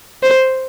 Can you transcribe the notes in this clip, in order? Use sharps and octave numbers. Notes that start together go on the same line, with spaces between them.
C5